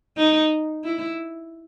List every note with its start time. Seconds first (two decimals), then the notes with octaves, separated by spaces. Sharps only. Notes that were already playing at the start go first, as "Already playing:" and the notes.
0.17 D#4
0.84 E4